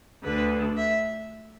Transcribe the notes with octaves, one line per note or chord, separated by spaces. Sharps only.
D2 D3 B4
E5